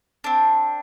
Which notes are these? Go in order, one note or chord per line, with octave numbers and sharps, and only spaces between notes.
C4 D4